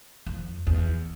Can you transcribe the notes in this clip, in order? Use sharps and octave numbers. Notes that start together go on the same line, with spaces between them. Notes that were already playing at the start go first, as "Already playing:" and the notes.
F2
E2